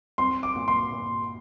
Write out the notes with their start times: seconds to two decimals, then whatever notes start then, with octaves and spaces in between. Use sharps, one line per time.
0.18 C4 C6
0.43 D6
0.56 A#2
0.68 C6
0.92 A#2